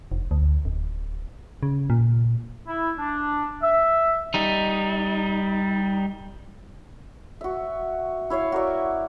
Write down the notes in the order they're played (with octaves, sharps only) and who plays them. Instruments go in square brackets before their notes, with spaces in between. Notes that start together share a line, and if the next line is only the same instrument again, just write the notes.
[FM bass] F1
D2
D1
C#3
A#2
[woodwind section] E4
D4
E5
[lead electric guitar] G3 D#4
[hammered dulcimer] F#4 E5
E4 C#5 E5 F5
F#4 A#4 D5